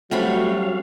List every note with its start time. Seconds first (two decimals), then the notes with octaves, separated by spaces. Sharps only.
0.11 F#3 G3 A3 C4 C#4 F#4 F5 B5